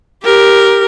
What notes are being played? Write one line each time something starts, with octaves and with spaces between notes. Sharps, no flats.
G4 A#4